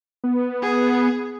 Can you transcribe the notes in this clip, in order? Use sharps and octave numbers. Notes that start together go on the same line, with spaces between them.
B3
G#4